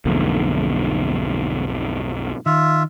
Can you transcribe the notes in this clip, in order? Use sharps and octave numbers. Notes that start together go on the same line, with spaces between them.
B1 F2 G#2 D3 A#3
D#3 F4 E5